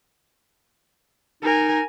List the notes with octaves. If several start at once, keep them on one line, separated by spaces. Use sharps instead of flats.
D#4 A#4 G#5